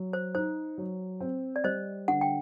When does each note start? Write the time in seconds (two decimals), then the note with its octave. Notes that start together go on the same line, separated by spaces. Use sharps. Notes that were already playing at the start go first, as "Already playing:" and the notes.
Already playing: F#3
0.13 C5
0.35 D#4 C5
0.78 F#3
1.20 C4
1.56 D5
1.64 G3 C5 D#5
2.08 D3 F#5
2.21 G5